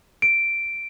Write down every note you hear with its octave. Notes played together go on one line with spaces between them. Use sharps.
D7